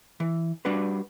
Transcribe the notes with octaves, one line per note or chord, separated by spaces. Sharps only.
E3
G3 D4 F#4 B4